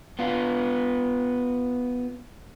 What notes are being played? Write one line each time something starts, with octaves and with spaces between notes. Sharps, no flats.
B3 F4